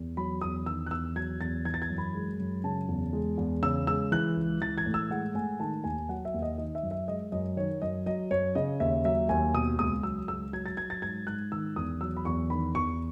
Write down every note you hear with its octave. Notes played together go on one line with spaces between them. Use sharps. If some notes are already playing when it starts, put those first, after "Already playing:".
Already playing: E2
F#3 B5
E2 D#6
D#3 E6
F#6
E2 E6
F#3 G#6
E2 A6
E3 G#6
A6
G#6
F#2
B5
G#3
F#2
C#3 A5
E2
G#3
E2
C#3 E6
G#3 E6
E3 F#6
C#2
E3 A6
G#6
A2
E6
G#3 F#5
A2 G#5
D#3 A5
D#2 G#5
F#3 F#5
E5
D#2
D#5
D#3 D#5
E5
F#2
E5
G#3 D#5
F#2 D#5
D#3 C#5
F#2 D#5
F#3 D#5
F#2 C#5
C#3 D#5
D#2 E5
F#3 E5
D#2 G#5
B2 D#6
C#2 D#6
F#3 E6
C#2 E6
F#3 G#6
A6
F#3 G#6
A6
G#2 G#6
G#2 F#6
D#3 E6
E2 D#6
F#3 E6
B5
E2 C#6
D#3 B5
E2 C#6